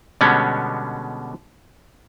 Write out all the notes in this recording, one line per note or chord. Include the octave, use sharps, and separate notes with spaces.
B2 D3 G3 G#3 B3 C#4